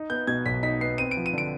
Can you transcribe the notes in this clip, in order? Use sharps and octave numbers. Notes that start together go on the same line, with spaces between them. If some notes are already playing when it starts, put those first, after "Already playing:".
Already playing: D#4
B3 G6
B2 G#6
B1 B6
D#4 B6
B3 C7
C4 D#7
D7
F3
D#7
D3 D7